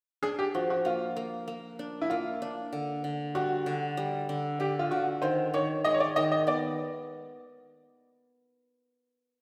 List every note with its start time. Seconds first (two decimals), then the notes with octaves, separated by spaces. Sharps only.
0.23 D4 G#4
0.39 G4
0.55 F3 F#4
0.70 F#4
0.85 A#3 F4
1.16 A#3
1.48 A#3
1.79 D4
2.01 E4
2.10 A#3 F4
2.42 D4
2.73 D3
3.04 D3
3.35 G3 F#4
3.66 D3
3.97 G3
4.29 D3
4.60 D3 G4
4.79 F4
4.91 D3 F#4
5.22 D#3 C5
5.54 D#3 C#5
5.84 G#3 D#5
5.94 C#5
6.00 D5
6.16 D#3 D#5
6.32 D#5
6.47 B3 D5